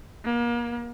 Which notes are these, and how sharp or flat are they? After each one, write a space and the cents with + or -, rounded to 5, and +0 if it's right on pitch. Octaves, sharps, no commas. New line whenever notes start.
A#3 +35